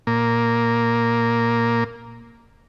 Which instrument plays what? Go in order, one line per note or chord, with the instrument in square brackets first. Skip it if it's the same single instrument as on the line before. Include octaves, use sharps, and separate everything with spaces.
[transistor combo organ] A#2 A#3